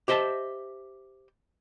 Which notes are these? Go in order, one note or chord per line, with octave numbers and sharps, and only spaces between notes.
G4 C5 D#5 E5 A5